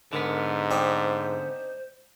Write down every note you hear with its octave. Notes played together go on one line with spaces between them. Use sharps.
G#2 D3 B3 A#4
C4 D4 D#4 C5